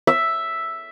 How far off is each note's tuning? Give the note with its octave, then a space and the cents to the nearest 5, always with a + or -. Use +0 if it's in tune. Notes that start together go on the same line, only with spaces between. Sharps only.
E5 +0